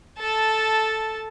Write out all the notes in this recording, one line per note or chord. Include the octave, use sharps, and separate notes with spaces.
A4 A5